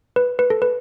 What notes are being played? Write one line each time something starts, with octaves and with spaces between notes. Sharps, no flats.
B4
B4
A4
B4